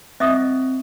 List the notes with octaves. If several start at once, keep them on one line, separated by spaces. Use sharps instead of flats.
C4 D#5 E5 D#6